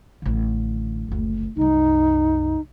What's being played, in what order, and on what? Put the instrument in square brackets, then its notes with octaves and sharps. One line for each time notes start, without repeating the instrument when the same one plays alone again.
[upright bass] A1 D3
F#1 D2
[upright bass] C2 F#2 [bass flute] D#4